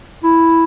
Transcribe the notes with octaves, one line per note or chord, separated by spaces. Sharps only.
E4